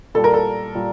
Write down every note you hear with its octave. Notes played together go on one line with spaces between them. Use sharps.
A#2 G3 A4
A#4
A4
A#2 G3